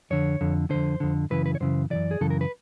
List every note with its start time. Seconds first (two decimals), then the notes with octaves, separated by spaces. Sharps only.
0.10 F2 D3 C#5
0.41 F2 D3
0.70 F2 D3 C5
1.00 F2 D3
1.30 F#2 C#3 E3 B4
1.46 B4
1.55 C#5
1.60 F#2 C#3 E3 C5
1.90 C#3 E3 D5
1.95 F#2
2.11 G#4
2.21 F#2 C#3 E3 A4
2.30 A#4
2.41 B4